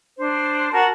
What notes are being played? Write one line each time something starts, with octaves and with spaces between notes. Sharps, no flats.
D4 C5
F#4 A#4 F#5 A5